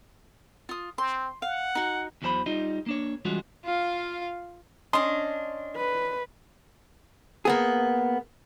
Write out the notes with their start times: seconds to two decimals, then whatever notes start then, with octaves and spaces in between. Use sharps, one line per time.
0.69 F4 D#6
0.98 C4 C6
1.42 F5 F#5
1.75 D#4 F#4
2.22 E2 E3 F#3 A4 C5 B5
2.46 G3 D#4 F4 D#5
2.86 A#3 D4 C#5
3.25 E3 G3 G#3 C#4 F4 F#4
3.65 F4 F5
4.93 C#4 D4 D#5 C6
5.76 B4
7.45 A#3 B3 G#4